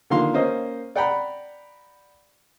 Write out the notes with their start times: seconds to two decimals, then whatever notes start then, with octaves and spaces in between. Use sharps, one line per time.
0.10 D3 D#3 F3 A#3 F5 C6
0.34 A#3 C#4 C5 D#5
0.96 D5 F#5 G5 A#5 B5